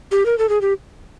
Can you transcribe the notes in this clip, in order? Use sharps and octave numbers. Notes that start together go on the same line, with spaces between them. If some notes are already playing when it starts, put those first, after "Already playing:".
G4
A#4
A4
G#4
G4